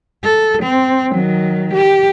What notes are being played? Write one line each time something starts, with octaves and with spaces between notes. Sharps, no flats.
A4
C4
D#3 F#3
G4